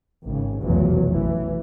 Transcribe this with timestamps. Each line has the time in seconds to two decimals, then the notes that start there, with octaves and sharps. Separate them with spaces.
0.24 G#1 C#3
0.60 F1 B1 E2 F#3
1.10 A1 E3